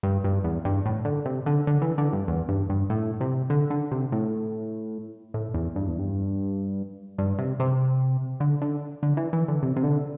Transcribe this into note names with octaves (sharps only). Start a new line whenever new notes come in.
G2
G2
E2
G2
A2
D3
C3
D3
D3
E3
D3
G2
E2
G2
G2
A2
C3
D3
D3
C3
A2
A2
E2
G2
E2
G2
G2
C3
C3
D3
D3
D3
E3
E3
D3
C3
C3
D3